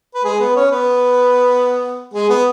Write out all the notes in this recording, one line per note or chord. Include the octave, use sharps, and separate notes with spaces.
B4
G#3 G#4
B3 B4
C#4 C#5
B3 B4
G#3 G#4
B3